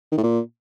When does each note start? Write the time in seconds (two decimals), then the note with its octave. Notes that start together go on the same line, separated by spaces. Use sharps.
0.12 D#3
0.18 A2
0.23 A#2